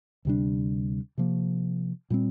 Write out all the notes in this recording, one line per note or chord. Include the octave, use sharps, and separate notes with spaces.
D2 C3 G3 D4
C3 F3 A#3
A#2 G3 C4